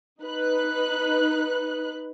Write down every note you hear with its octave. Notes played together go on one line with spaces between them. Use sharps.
D#4 B4 F#6